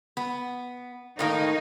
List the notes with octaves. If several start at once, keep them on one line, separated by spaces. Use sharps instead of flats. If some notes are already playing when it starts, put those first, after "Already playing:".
B3
A2 D#3 A#3 D#4